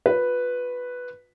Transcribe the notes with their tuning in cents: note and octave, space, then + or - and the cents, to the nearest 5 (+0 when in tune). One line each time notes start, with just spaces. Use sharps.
F4 +40 B4 +0